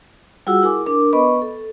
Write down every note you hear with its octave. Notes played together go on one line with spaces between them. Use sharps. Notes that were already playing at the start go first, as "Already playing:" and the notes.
G3 F4 F#4 G#4 F#5 E6
E4 G#4 A#4 G#5 D6
D4 A#4 D6
B3 B4 D#5 B5 C#6
A4